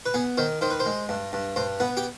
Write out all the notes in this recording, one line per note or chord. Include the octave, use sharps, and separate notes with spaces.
B4
B3 G#4
D#3 C5
D#3 C5
B4
C5
G#3
G2
G2
G2 C5
B3 B4
G4